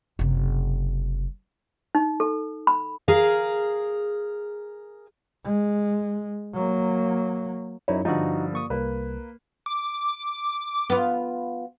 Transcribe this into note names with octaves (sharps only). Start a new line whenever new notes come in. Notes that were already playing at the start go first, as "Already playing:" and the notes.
F#1 C3
D#4
A4
B5
G#4 A#4 F5
G#3
F#3 A#3
F#2 D#4 E4 C#5
G2 D3 F3 D#4 F#4
A#3 C#6 D#6
C2 A#3 B4
D6
B3 F4